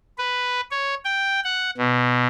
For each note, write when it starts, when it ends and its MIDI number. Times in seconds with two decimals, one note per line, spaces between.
0.18 0.61 71
0.71 0.95 73
1.05 1.40 79
1.44 1.70 78
1.78 2.27 47